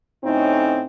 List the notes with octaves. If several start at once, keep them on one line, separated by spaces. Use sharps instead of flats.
D2 A2 C4 C#4 D#4